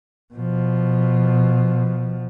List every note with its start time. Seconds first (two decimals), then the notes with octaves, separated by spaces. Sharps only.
0.34 B2 F3